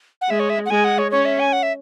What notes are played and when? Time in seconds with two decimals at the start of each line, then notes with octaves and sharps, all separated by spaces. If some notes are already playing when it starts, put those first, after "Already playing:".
0.21 F#5
0.30 G#3 E5
0.40 C#5
0.50 E5
0.66 F#5
0.70 G#3 G#5
0.84 F#5
0.98 C#5
1.11 C#4 C#5
1.25 E5
1.39 G#5
1.53 F#5
1.63 E5